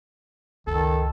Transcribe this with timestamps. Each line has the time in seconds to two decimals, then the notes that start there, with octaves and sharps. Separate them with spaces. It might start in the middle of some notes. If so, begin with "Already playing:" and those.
0.67 C#2 F#2 D#3 A4